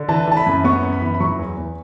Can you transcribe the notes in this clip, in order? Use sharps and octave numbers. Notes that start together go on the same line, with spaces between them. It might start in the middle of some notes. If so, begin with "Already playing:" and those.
Already playing: D3
E3 A5
E3 A5
B5
F#2
B3 C#6
F#2
B5
E3
B5
F#3 C#6
E2
E2